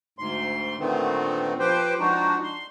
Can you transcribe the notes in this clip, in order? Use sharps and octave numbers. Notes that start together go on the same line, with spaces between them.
D2 G#2 C6
A#2 D3 D#3 A3 B3 C4
F3 G4 B4 C5 G5
F3 G#3 D4 D#4 F#4
C6